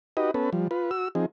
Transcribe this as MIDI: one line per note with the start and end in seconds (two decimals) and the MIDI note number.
0.17 0.31 63
0.17 0.31 66
0.17 0.31 67
0.17 0.31 71
0.17 0.31 75
0.34 0.50 59
0.34 0.50 61
0.34 0.50 69
0.34 0.50 71
0.53 0.68 53
0.53 0.68 55
0.71 0.91 65
0.71 0.91 71
0.91 1.08 66
0.91 1.08 88
1.15 1.26 53
1.15 1.26 60
1.15 1.26 63
1.15 1.26 68